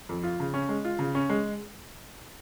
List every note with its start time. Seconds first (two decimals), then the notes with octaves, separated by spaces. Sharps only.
0.09 F2
0.24 F4
0.40 C#3
0.54 C#4
0.69 G#3
0.85 F4
0.99 C#3
1.15 C#4
1.29 G#3